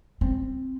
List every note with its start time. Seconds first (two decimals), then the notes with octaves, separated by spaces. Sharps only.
0.21 C4